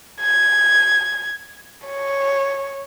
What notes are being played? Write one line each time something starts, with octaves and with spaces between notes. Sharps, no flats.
G#6
C#5